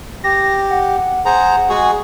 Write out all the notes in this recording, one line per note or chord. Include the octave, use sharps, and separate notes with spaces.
G4 A#6
F#5
G#4 C5 F#5 A#5
G#3 F#4 G#4